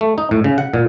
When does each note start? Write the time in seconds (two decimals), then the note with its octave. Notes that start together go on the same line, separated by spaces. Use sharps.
0.01 A3
0.18 D#4
0.31 A2
0.44 C#3
0.58 F#5
0.74 A#2